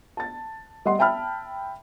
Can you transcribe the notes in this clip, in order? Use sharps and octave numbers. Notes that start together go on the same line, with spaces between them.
A5 A6
G3 D#5 F#5 C6
E5 G5 A5 B5 F6